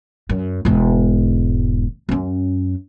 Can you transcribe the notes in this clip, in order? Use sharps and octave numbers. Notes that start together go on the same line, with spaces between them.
F#2
E1 G#2
F#2 C#4